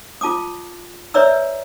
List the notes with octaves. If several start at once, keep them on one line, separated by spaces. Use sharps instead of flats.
F4 A5 D6 D#6
B4 C#5 D5 E5 A#5 E6